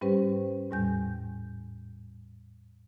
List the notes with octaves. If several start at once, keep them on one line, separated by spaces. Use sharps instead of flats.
G#2 G3 C#4 G4 B4 C5
E2 A2 G3 G#5 G6